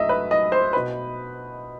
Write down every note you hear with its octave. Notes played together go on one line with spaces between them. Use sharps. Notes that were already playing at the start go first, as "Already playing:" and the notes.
Already playing: F#2 F#3 A3 D#5 E5
B4
D#5
C5
B2 B4